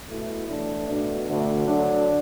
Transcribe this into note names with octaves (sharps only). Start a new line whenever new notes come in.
B2 A3 E4
A2 E3 A3 D4
B2 A3 D4
D2 D3 A3
D2 D3 F#3 D4